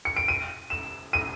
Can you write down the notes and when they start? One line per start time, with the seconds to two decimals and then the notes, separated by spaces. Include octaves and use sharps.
0.05 C#7
0.17 D7
0.28 D#7
0.70 E7
1.13 D#7